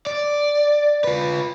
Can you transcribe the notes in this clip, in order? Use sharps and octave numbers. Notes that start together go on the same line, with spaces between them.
D5
F4 B4